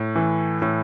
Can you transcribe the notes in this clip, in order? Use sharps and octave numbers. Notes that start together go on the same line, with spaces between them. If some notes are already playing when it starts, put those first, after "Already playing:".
Already playing: A2
E3
A2